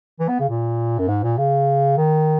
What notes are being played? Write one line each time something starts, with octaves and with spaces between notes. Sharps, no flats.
E3
B3
C#3
A#2
F#2
G#2
A#2
C#3
D#3